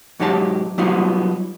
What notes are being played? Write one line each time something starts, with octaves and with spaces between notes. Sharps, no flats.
G#2 F#3 D#4 G4 B4 A5
F#3 G3 B3 D#4 F4 F#4